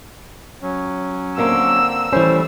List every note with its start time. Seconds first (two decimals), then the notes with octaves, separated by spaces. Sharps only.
0.62 F#3 C#4
1.38 D3 A#3 C4 E6
2.13 E3 G3 A3 C#4 C5